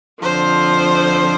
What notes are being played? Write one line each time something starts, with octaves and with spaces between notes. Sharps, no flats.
F2 D3 F3 C5